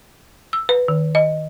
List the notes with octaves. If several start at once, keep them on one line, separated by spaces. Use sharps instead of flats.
E6
B4
D#3
D#5